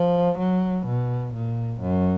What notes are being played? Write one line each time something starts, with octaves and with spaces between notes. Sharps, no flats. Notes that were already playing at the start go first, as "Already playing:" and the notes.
Already playing: F3
F#3
B2
A#2
F#2